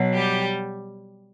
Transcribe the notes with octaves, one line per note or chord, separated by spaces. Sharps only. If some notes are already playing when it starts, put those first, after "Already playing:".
Already playing: B2 F#3
G3 G4